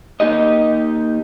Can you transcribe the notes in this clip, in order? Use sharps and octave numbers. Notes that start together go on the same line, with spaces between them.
A#3 D#4 G4 D#5